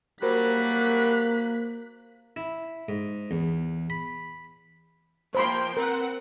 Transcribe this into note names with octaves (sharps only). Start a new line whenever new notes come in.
F#3 G3 A#3 F#4 A#4 C5 F#6 B6
E4
G#2
E2
B5
F3 A#3 C5 G5 B5 C6
C4 A#4 B4 F#5